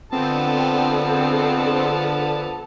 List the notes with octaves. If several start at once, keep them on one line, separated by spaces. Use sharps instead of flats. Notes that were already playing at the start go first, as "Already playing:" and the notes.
D3 F3 B3 C4 A4 A5